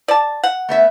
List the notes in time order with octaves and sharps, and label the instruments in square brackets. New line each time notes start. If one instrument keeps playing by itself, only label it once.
[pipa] D5 A5
F#5
[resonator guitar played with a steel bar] A3 B3 E5